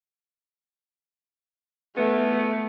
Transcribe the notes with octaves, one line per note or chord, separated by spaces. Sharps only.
A3 B3